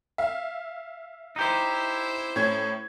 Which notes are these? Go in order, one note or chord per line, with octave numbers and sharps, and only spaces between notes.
E5 F5
D#4 E4 G4 C5
A2 C#4 G#6